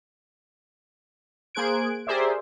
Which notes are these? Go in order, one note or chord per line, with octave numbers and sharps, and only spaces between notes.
A#3 G#4 C5 F#6 G#6 D7
G4 G#4 A#4 C5 D5 E5